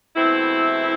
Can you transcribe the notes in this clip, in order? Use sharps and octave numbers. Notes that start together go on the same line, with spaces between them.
E2 B2 A3 C4 E4